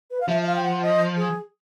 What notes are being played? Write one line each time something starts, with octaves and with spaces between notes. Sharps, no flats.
B4
F5
F3 E5
E5
F5
G5
F#5
D#5
G#4